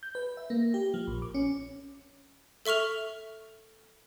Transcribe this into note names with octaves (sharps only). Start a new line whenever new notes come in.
G6
B4
E5
A#3
G4
F3
A#1
D6
C#4
A4 E5 C#6 F6 F7